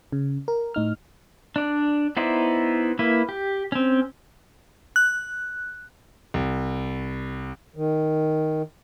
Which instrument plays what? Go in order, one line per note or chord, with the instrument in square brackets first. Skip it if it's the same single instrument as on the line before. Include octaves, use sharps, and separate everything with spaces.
[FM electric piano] C#3
A#4
A2 D#4 F6
[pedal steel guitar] D4 D5
B3 D#4 E4 C5 D5
A#3 E4 B4
G4
C4 C#4
[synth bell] F#6
[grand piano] C2
[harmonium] D#3